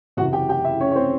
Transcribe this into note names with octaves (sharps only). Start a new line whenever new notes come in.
F#1 E2 C3 F#4 F#5
G4 G5
G4 G5
E4 E5
C#4 C#5
C#5
C4 C5